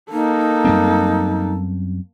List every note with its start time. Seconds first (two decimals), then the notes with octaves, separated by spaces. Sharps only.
0.12 A#3 D#4 A4
0.65 F#2 G3 C4